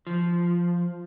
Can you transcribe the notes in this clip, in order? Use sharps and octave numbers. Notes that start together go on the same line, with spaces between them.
F3